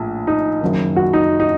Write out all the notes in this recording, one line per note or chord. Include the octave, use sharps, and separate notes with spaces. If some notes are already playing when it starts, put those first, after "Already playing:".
Already playing: A#1 A2
D#4
F#1 F#2 D#3
F#4
D#4
D#4